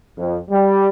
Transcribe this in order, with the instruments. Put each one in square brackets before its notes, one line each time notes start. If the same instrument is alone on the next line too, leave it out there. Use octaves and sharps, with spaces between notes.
[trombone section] F2
G3